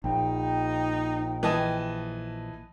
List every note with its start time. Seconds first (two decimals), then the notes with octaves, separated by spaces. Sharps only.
0.04 A#1 D#4 G5
1.43 E3 D#5 A5